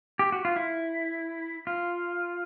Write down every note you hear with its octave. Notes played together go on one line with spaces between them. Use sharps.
G4
F#4
F4
E4
F4